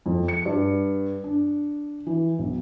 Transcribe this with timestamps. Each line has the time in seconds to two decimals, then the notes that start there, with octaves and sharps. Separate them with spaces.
0.06 F2
0.28 C#7
0.45 G2
1.24 D4
2.07 E3
2.39 B1